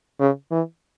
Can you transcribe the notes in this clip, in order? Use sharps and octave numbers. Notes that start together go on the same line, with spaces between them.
C#3
E3